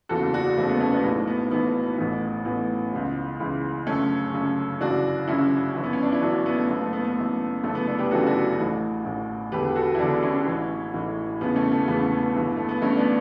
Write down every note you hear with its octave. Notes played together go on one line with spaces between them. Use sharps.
F#1 E2 C#3 E3 F#4 A4
D4 F#4
F#1 E2 C#3 E3 A3
B3
A3 C#4
B3 D4
B1 A2 E3
B3
B1 A2 E3 B3
A1 A2 E3
A1 A2 E3 B3
C#2 C#3 E3
C#2 C#3 E3
G1 F#2 C#3 A3 C#4
G1 F#2 C#3
G1 F#2 C#3 E3 D4 F#4
G1 F#2 C#3 E3 C#4 E4
G1 F#2 E3
B3
C#4
D4
E4
G1 F#2 E3 D4 F#4
B3
A3
F#1 F#2 E3 B3
A3
B3
B3
F#1 F#2 E3
G1 F#2 C#3 E3 A3
B3
B3 D4
G4 B4
G1 F#2 C#3 E3 F#4 A4
D4 F#4
A1 A2 E3
A1 A2 E3
E1 E2 D3 G4 B4
F#4 A4
E4
E1 E2 D3 D4 F#4
C#4 E4
A1 A2 E3
A1 A2 E3
E1 E2 C#3 E3 B3
A3 C#4
A3
E1 E2 C#3 E3 B3
B3
G1 G2 E3
A3
B3
G1 G2 E3 A3 C#4
B3 D4